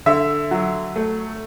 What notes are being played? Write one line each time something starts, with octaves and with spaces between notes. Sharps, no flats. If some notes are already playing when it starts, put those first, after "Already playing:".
D3 E5
F#3
A3